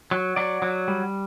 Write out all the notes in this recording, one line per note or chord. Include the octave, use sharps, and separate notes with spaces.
F#3
F#3 D5
F#3
G3